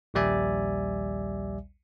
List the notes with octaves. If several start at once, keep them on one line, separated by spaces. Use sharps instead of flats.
A#1 D#2 G3 D5 E5 G#5